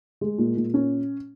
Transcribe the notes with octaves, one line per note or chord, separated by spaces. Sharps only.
G#3
A#2
A#2
C#4